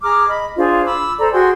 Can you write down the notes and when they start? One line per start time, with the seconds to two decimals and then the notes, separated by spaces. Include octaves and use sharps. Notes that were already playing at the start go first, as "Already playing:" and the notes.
0.03 G#4 A#5 D6 F6
0.28 D#5 B5
0.57 D4 F4 G#4 C5
0.85 B5 D6 E6
1.19 A4 C5 D5 A#5
1.32 F#4 G#4 G5 C6